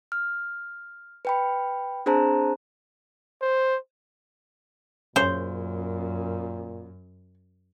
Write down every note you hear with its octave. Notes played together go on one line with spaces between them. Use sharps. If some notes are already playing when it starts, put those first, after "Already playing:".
F6
B4 G5 B5
C4 D4 G#4 C5 A5 A#5
C5
F#2 A#2 C#3 C5 C#5